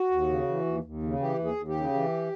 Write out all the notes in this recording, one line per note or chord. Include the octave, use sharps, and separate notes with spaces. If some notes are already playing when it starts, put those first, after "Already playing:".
Already playing: F#4
D#2
C#3
E3
D#2
D#2
C#3
E3 G4
D#2
G#4
D#2
G4
C#3
E3